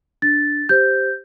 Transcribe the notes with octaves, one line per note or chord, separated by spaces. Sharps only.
D4 A6
G4 C5 G6